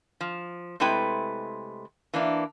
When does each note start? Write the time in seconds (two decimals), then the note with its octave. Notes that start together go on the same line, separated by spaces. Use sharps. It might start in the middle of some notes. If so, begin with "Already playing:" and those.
0.21 F3
0.80 C3 G#3 A3 E4 B4 G5
2.14 E3 A#3 D4